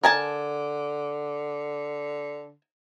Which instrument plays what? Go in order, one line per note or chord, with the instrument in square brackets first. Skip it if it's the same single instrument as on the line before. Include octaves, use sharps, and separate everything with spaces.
[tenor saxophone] D3 [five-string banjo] A#4 G#5 A5